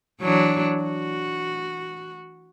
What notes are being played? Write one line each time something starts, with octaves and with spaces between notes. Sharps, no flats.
E3 F#3 D4
F#4